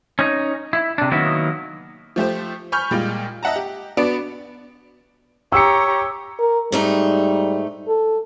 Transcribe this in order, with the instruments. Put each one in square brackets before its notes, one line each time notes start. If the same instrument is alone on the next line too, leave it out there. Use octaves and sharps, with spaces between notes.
[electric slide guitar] C#4 D#4
E4
C3 D4
D#3 F#3 A#3 B3 E4
[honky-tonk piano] F3 A3 G4 C5
G#5 B5 C#6 F6 G6
A#2 G3 G#3 F4
D#5 E5 F#5 A5 A#5
G4
B3 D4 F#4 D5 B5 D7
[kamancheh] G4 A#5 [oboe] C#5 [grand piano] E6 C#7
[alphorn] A#4
[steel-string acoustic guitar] G#2 A3 D#4 [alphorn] G3
[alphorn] A4